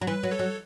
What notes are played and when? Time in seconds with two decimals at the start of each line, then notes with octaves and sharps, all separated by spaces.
0.01 F#3
0.07 E3 B4
0.23 F#3
0.31 A4 C#5
0.39 F#3